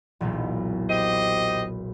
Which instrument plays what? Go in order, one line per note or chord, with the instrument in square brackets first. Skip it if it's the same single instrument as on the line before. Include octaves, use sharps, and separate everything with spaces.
[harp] E1 B1 A#2
[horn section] G4 C5 D#5